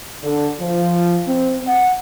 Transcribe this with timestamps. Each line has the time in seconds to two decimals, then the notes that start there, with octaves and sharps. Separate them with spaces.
0.24 D3
0.61 F3
1.28 C4
1.66 F#5